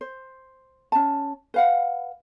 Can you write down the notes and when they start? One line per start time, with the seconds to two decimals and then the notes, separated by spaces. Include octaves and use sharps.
0.01 C5
0.92 C#4 A5
1.54 B4 F5 F#5